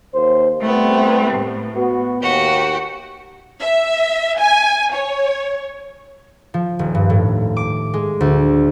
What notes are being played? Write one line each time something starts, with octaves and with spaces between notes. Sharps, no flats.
D#2 C5
C2 A3 B3 C4
A2
B3 F#4
D#2 F#4 G4
E5
G#5
C#5
F3
D#1
G2
A2
D6
G#3
D2